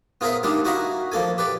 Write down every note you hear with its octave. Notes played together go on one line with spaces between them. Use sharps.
B3 F4 G#4 A#4 C5 E5
G3 A#3 D4 D#4 F4
E4 F#4 D#5 F5 A#5 B5
F3 A#3 A4 G#5
G4 B4 D5